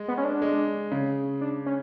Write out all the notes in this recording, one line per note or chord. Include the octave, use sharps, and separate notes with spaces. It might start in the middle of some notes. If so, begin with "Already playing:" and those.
Already playing: G#3
B3
C#4
D4
G#3
C#3
D4
C#4